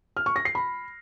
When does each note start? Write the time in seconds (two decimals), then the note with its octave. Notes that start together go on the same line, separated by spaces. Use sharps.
0.17 F6
0.26 C#6
0.36 A#6
0.45 C7
0.55 B5